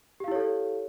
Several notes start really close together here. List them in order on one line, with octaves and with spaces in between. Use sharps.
G4 F5 E4 C#5 A4